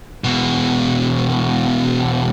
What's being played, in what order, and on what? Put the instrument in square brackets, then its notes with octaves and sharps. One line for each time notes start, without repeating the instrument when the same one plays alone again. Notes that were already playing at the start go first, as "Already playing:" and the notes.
[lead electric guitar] E2 B2